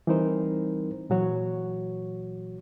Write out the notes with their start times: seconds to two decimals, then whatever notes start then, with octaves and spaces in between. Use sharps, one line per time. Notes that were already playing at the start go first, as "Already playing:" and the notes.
0.07 E3 G3 C4 D#4 A#4 C5
1.10 A#2 E3 F#3 F#4 C#5